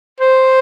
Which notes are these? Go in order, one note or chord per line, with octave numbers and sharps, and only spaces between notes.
C5